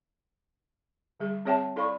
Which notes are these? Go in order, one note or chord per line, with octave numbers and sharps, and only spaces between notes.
D3 G3 G#4
C4 G#4 C#5 E5 G5 A5
E4 A4 D5 F5 B5 C#6